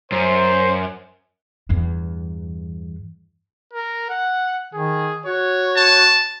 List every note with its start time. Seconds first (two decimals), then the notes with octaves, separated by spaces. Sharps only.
0.12 F#2 C5
1.69 E2 G2
3.73 A#4
4.09 F#5
4.74 D#3 G#4
5.26 F#4 C#5
5.77 A5